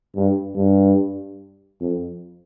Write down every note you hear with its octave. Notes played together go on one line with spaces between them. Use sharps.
G2
G2
F2